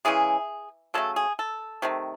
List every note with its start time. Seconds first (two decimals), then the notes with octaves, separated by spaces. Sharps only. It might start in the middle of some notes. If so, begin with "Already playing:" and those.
0.05 C#3 E3 G#3 G#4
0.94 C#3 F#3 A3 A4
1.16 G#4
1.39 A4
1.82 C3 D#3 A3